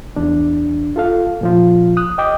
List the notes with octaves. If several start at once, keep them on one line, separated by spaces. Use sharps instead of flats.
E2 D4
F4 A4 F5
A#2 F3 F4
D#6 F#6
D#5 G5 D6 D#6